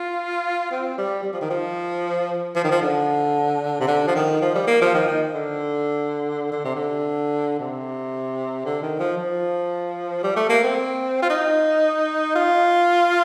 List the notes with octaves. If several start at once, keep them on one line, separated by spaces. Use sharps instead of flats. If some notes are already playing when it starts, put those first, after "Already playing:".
Already playing: F4
C4
G3
G3
F3
D#3
F3
F3
D#3
F3
D3
C3
D3
F3
D#3
F3
G3
A#3
F3
D#3
D#3
D3
D3
C3
D3
C3
D3
D#3
F3
F3
G3
A3
A#3
C4
F4
D#4
F4